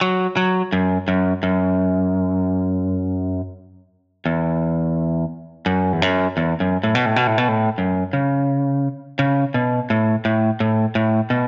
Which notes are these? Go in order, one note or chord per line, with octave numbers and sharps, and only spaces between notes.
F#3
F#3
F#2
F#2
F#2
E2
F#2
E2
F#2
E2
F#2
A2
B2
A2
B2
A2
B2
A2
F#2
C#3
C#3
B2
A2
A2
A2
A2
B2